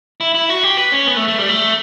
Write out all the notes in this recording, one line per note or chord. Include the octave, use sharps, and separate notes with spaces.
E4
E4
F#4
G4
B4
C#4
B3
A3
A3
G3
A3